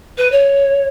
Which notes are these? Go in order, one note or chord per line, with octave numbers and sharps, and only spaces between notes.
B4
C#5